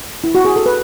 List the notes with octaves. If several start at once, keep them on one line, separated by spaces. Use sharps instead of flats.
E4
F#4
G#4
A4
B4